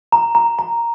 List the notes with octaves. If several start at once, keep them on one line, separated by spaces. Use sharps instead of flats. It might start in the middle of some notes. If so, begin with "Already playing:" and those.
A#5
A#5
A#5